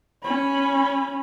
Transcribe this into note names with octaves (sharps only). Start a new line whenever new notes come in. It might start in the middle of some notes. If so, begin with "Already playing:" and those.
C#4 B5